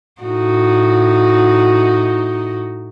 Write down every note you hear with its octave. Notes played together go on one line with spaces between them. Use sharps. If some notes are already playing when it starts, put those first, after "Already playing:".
A2 D#4 F#4